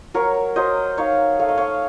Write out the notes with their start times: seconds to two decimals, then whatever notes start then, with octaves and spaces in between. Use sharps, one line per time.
0.14 F#3 A#4 C#5
0.56 F#3 C5 D#5
0.97 D#4 C#5 F5
1.40 A3 F5
1.49 D#5
1.58 C#5 F5